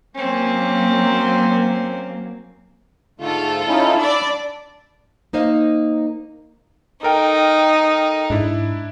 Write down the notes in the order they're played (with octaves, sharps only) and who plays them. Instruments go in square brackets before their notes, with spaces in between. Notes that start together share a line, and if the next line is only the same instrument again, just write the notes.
[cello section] F#3 A#3 [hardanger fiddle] C4 C#4
[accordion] G#2 D3 A3 [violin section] F4 A4
[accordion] C#4 D#4 E4
[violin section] D4 D5 [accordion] B5 E6
[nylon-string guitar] A#3 D#4 C5 D#5 F5
[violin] D#4 [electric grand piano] A4 A#4 G5
[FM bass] G#2 [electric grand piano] D4 E4